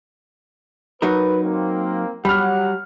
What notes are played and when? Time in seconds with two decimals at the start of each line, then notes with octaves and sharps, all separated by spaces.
1.02 F#3 D#4 A#4 B4
1.43 A#3 C4
2.25 F#3 G3 G4 F#5 B5 F6